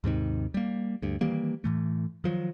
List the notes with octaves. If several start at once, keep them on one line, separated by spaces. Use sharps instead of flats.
D#2 G#2 C3 D#3
G3 A#3
D2 G2
D#3 E3 G3 A#3
A2 E3 A3
D#3 F3 F#3